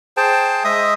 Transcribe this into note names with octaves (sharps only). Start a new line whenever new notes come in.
G#4 C5 G5 A5
G#3 D#5 E5 D#6